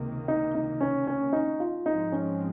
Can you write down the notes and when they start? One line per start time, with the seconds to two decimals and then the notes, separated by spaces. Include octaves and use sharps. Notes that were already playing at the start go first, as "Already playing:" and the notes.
Already playing: C#2 C3 D#3 A#3
0.28 D#4
0.55 D#4
0.81 C#4
1.07 C#4
1.33 D#4
1.60 F4
1.86 G#2 F3 G#3 C4 D#4
2.12 C#4